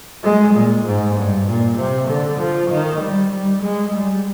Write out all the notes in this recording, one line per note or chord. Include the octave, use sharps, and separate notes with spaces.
G#3
A#2
G#2
G2
A#2
C3
D3
F3
D#3
G3
G3
G#3
G3